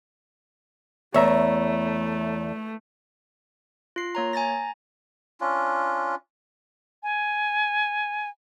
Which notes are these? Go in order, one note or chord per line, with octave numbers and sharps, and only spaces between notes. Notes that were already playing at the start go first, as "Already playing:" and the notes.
E2 A3 C#5 E5 A#5
F4 C7
A#3 C#5 A#5
G#5 A#5 A6 A#6
C#4 D4 F4
G#5